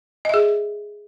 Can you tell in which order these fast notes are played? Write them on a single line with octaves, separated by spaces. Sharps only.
D#5 E5 G#4